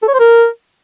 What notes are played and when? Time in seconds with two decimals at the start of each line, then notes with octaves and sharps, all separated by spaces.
0.03 A4
0.08 C#5
0.14 C5
0.20 A#4